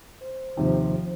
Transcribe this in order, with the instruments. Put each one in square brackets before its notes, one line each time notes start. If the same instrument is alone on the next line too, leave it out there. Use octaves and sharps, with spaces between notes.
[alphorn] C5
[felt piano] D#2 C3 [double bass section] F3